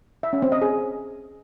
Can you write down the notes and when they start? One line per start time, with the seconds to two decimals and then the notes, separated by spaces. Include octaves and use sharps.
0.23 E5
0.33 C#4
0.42 C4
0.52 D#5
0.61 G#4